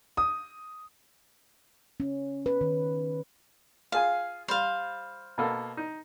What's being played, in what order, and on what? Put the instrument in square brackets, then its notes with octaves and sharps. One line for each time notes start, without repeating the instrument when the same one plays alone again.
[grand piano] D#6
[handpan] C#4
B4
D#3
[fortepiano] F4 G#4 G#5 [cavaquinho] F5
[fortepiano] G3 [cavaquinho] C5 F5
[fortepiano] B2 A#3 A4
D#4